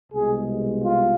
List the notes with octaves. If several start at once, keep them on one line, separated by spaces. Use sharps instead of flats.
C2 B2 G#3 G#4
F4